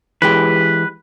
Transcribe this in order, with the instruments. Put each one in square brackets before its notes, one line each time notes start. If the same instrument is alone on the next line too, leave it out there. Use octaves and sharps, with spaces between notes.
[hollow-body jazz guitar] E3 G#3 G4 [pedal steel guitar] B4